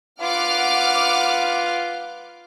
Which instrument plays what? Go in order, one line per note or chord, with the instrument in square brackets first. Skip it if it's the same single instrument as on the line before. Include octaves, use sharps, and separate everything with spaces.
[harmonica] F4 B4 [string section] F#5 D6 F6